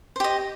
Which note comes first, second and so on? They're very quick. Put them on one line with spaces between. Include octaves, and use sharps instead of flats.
C5 G4 D#5